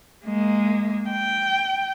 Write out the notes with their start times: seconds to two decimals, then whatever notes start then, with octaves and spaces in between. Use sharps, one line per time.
0.24 G#3 A#3
1.10 G5